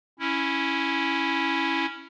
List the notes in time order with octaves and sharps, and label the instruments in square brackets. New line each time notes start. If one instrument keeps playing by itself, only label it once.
[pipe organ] C#4 E4